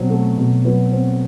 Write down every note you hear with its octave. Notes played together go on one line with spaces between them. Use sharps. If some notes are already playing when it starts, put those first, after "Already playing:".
Already playing: B2 F#3 C4
A3
B2
F#3 B4
C4